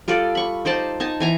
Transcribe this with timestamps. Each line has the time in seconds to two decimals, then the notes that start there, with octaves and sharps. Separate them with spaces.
0.08 G3 F4 A4 D5
0.35 B5 C#6
0.65 D#4 C5 D5 A5
1.00 D#4 G#5 A5
1.20 E3 G#5 A#5